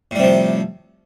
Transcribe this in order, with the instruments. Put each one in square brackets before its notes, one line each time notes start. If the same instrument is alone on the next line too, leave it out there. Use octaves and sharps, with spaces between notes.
[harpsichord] A2
G3
C3
F3